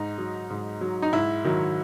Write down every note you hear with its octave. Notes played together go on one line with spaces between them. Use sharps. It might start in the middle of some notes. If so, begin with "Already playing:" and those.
Already playing: G#2 D#4
F#3
G#2
F#3
D#4
G#2 E4
D#3 F#3